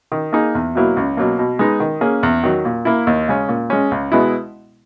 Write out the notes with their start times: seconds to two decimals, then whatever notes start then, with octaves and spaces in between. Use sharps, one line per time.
0.12 D#3
0.33 A#3 D#4 G#4
0.55 E2
0.75 B2 F#3 A#3 E4
0.97 C#2
1.17 B2 F#3 A#3
1.39 B2
1.59 G#3 B3 D#4
1.80 D#3
2.01 A#3 C#4 G#4
2.23 E2
2.43 D#3 F#3
2.65 A#2
2.85 A#3 E4
3.07 D#2
3.28 C#3 G#3 C#4
3.49 A#2
3.70 G#3 C#4
3.91 C#2
4.12 B2 G#3 B3 E4